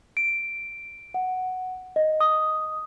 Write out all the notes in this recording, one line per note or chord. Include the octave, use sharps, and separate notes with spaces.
D7
F#5
D#5
D#6